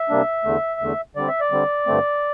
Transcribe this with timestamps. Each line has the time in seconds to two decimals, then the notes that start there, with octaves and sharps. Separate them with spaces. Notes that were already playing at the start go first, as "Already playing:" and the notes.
Already playing: E5
0.10 C3 G3 A#3 D4
0.44 E2 D3 A3
0.80 E2 D3 A3
1.15 D3 G3 C4 D5
1.28 E5
1.41 D5
1.51 D3 G3 C4
1.87 G2 D3 A3 C4